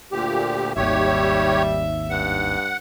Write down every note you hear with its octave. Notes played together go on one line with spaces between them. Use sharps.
D2 A#2 G4
G#1 D#2 G3 G4 C#5 E5
G2 F#5